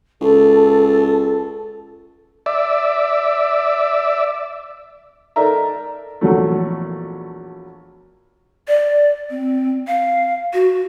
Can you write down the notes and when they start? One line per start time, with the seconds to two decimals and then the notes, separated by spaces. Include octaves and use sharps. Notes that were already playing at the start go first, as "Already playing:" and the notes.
0.21 C#2 A4
2.46 D5 E5
5.36 D#4 A4 A#4 D5 E5 A#5
6.21 A#1 E2 F#3 A3
8.68 D5
9.30 C4
9.88 F5
10.53 F#4